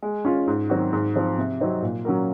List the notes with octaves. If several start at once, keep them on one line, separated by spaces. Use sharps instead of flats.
G#3
C#4 F4
G#2
D#3 F#3 C4 F#4
G#2
F3 C4
C3
F#3 C4 D#4
A#2
F#3 C#4 F#4 A#4